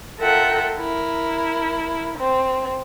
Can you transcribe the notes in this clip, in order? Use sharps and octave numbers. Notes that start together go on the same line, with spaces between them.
F4 A4 A#4 E5 F#5 G5
E4 A#4
C4